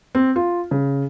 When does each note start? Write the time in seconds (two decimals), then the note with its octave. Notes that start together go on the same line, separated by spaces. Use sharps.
0.15 C4
0.36 F4
0.71 C#3